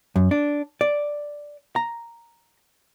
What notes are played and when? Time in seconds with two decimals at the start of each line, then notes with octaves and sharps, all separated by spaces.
0.16 F#2
0.31 D4
0.81 D5
1.76 A#5